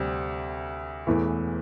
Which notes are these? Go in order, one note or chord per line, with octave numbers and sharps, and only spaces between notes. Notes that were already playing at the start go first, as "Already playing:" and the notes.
Already playing: D2 C3 G3 C4
E1 E2 E3 A3